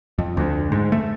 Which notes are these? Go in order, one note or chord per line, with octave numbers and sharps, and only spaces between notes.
F2
D2
G#2
A3